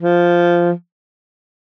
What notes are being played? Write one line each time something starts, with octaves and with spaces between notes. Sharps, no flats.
F3